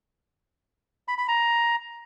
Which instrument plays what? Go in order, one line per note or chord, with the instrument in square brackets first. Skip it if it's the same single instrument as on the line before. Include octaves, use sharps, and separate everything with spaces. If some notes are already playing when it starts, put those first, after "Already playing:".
[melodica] B5
B5
A#5